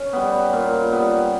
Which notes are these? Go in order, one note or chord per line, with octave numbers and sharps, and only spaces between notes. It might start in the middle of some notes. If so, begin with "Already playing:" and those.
Already playing: C#4
G3 B3
A#2
G3 B3